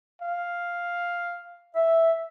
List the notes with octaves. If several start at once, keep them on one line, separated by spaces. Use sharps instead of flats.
F5
E5